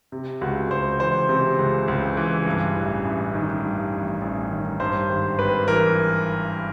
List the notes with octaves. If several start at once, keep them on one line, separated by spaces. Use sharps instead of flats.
C3
C#2 F#4
C#2 C5
E3 C5
C3
C#2
C#2
E3
G2
A1
A1
D#3
G2
A1
A1
D#3
G2 C5
G#1
G#1 B4
E3 A#4